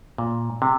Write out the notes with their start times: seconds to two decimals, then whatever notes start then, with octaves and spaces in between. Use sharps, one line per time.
0.18 A#2
0.62 C3